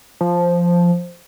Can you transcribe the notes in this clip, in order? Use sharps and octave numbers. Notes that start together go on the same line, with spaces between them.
F3